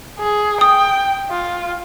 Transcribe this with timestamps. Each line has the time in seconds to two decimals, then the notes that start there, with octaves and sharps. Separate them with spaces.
0.19 G#4
0.61 G5 D#6
1.29 F4